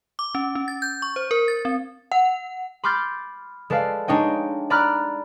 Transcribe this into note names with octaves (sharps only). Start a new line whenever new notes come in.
D6
C#4
C#4
A6
G6
C#6
C5
A#4
A6
C4
F#5
B5 C6 D6 F6 G6 A6
G#3 A4 B4 D5 F5
G#3 D4 D#4 C#5 D#5 G5
D5 A#5 B5 D6 F6 F#6